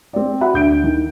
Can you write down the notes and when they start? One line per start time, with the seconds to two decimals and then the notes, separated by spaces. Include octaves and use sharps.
0.13 C4 D5
0.41 F#4 E5 F#5 B5
0.54 D2 G6 D7
0.84 D#3